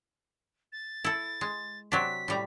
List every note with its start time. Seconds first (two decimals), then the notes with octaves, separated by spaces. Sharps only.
0.72 A6
1.04 E4 A4
1.41 G#3
1.92 C3 F#3 D4 B6
2.28 A2 G3 A#5